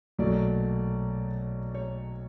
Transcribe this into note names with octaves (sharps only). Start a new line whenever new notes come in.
B1 A#2 F#3 A3 D5
C#5